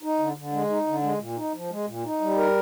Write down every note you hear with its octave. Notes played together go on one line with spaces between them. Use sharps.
D#4
D3
D3
G#3
D#4
D3
G#3
A#2
D#4
F3
G#3
A#2
D#4
G3
A#4